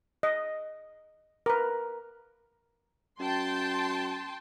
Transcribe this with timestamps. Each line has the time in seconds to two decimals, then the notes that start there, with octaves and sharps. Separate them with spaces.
0.23 D#5
1.46 A#4 B4
3.19 F#2 G5 A5 C6